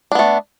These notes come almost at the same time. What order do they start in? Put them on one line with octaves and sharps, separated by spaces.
D4 B3 A3